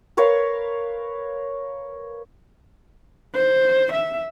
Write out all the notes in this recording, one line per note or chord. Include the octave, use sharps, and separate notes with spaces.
A#4 B4 C#5 F5
C5
E5